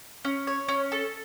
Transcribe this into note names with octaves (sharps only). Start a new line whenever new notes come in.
C#4
C#5
C#4
A4